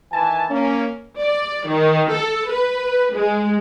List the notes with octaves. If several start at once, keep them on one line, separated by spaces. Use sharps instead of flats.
D#3 E3 G#5 A5
A#3 C#4
D5
D#3
A4
B4
G#3